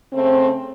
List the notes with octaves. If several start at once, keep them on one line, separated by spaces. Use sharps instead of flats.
C#3 A3 C4